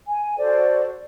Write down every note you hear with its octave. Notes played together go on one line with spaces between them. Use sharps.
G#5
F#4 A4 C5 D5